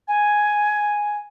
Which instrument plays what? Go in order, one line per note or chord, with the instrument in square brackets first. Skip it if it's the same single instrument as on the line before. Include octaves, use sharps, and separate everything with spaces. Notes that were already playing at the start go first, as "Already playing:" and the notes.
[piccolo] G#5